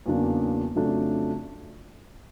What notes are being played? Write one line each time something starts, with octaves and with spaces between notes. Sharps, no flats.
E2 C#3 F#3 A#3 D4
F2 C#3 F#3 A3 D4